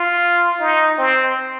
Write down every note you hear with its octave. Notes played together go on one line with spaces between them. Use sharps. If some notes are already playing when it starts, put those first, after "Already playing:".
Already playing: F4
D#4
C4